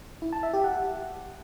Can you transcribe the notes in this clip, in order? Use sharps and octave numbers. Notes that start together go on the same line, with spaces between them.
E4
A5
E5
G4
F#5